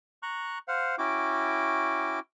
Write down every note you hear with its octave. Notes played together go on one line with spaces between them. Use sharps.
A#5 C#6 F#6
C5 F5 F#5
C#4 E4 F#4 G5 D6